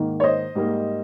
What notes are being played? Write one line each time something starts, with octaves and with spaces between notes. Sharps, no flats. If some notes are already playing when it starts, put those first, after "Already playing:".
Already playing: G#2 D#3 A#3
C#5
C5 D#5
G#2 G3 A#3